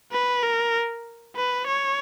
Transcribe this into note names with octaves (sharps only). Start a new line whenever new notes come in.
B4
A#4
B4
C#5